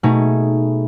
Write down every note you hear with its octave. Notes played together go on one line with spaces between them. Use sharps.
B2 A3 D#4 G#4